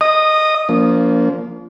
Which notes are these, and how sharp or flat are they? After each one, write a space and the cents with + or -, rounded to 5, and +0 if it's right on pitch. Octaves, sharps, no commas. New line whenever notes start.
D#5 +0 D#6 -15
F3 -15 A#3 +0 D4 -40